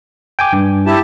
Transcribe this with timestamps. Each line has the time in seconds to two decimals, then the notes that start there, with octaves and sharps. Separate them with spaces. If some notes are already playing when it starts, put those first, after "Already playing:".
0.39 G5 G#5 D6
0.53 G2
0.86 E4 G4 A5